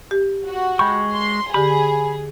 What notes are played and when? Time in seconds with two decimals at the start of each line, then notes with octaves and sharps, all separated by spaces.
0.11 G4
0.47 F#4
0.79 G#3 G5 B5 C#6 G6
1.13 C6
1.54 D3 G4 G#4 B5